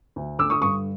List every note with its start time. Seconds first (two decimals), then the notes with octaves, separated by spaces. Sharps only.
0.16 D2
0.39 D3 D6 E6
0.50 C#6 D#6
0.61 G2 C#6 D#6